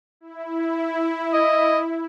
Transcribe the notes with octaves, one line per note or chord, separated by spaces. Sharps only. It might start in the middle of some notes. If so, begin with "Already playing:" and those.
E4
D#5